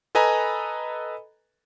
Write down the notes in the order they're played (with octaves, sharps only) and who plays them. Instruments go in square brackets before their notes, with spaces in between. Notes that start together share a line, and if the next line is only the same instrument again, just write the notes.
[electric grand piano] A4 B4 D#5 G#5 A#5 B5